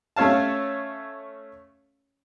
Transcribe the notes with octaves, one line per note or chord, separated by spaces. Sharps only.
A3 C#4 C#5 F5 A5